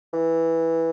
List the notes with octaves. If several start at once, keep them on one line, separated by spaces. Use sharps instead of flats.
E3